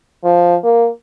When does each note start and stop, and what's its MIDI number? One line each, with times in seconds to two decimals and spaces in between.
0.24 0.55 53
0.64 0.88 58